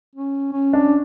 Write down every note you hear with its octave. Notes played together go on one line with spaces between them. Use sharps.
C#4
C#4
D4